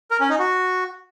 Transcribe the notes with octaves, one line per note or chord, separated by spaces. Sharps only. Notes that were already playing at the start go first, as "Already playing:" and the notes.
A#4
C#4
D#4
F#4